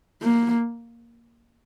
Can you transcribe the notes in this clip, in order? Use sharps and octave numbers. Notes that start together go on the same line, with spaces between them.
A#3